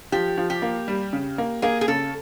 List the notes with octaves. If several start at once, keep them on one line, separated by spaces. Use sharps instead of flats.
F3 G4
F3
G4
A#3
G3
C#3
A#3
A#3 G#4
G#4
C#3 A4